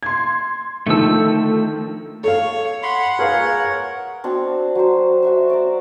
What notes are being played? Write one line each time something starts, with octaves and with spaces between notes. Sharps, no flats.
C6 G#6
D3 D#3 F3 A3 E6
A4 C#5 F5
F#5 B5 C6
G#4 A#4 B4 C#5 F5
C4 D4 F#4
F#3 C5
F#4 E5 E6
D5 A#5